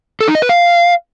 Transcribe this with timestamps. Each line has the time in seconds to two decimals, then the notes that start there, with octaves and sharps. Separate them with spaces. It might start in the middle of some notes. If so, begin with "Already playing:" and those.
0.21 A4
0.28 D#4
0.35 D#5
0.42 B4
0.49 F5